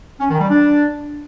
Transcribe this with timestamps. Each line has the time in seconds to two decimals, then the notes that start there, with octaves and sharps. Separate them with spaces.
0.20 C#4
0.30 D#3
0.40 G3
0.50 D4